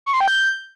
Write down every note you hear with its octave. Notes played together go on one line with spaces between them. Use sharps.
C#6
C6
G5
G6